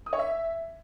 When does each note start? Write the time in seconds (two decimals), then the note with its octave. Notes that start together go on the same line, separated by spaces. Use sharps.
0.06 D#6
0.13 C#5
0.19 E5